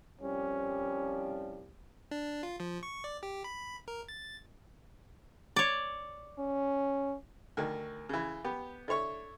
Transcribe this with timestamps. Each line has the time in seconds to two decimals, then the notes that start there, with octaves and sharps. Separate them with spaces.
0.21 C2 F3 G3 C#4
2.11 D4
2.43 F4
2.60 F3
2.83 C#6
3.04 D5
3.23 G4
3.44 B5
3.88 A#4
4.09 A6
5.56 C#5 D5
6.39 C#4
7.57 D2 D#3
8.09 C#3 E3
8.45 B3 G4
8.88 D3 E4 C#5 C#6